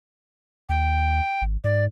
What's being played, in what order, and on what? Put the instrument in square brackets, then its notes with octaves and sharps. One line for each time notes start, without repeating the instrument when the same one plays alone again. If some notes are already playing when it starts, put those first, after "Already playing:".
[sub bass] D#2 [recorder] G5
[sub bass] G#1
[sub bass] G#2 [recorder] D5